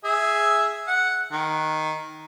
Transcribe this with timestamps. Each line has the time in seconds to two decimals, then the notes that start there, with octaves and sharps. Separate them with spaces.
0.04 G#4 E5
0.88 F#5
1.32 D#3